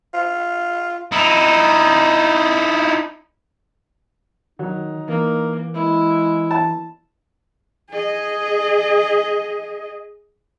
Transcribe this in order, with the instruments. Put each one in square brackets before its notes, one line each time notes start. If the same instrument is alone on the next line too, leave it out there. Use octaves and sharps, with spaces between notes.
[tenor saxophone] F4
[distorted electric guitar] D#4 E4
[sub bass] D#3 [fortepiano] F#3 [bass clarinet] D#4
[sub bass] E3 [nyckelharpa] A#3
[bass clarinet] G#3 [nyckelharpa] E4
[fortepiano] A5
[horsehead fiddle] G#4 D#5